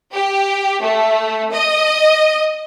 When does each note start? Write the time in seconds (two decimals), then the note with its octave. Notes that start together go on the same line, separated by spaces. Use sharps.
0.14 G4
0.83 A3
1.53 D#5